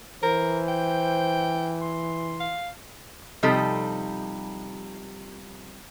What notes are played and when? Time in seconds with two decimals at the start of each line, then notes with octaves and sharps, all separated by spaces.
0.23 E3 A#4 C5
0.68 G5
1.81 C6
2.40 F5
3.43 C3 F3 G3 D#4 A4